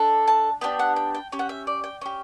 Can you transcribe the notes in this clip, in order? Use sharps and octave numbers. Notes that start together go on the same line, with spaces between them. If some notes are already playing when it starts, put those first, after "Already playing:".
Already playing: D4 A4
A5
B3 D4 G4 G5
F#5
G5
G5
C#4 G4
F#5
E5
D5
G5
C#4 G4